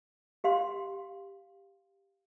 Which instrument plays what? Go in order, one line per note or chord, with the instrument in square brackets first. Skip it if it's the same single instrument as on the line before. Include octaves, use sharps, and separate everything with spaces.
[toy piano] G4 F5 C6